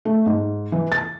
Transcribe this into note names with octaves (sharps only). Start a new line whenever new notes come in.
A3
G#2
E3
A6